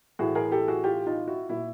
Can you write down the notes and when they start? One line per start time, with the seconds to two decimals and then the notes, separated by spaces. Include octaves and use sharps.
0.19 A2 E3 F#4 G#4
0.35 G#4 A#4
0.52 G4 A4
0.68 F#4 G#4
0.84 F4 G4
1.06 D#4 F4
1.27 E4 F#4
1.49 A#2 E4 F#4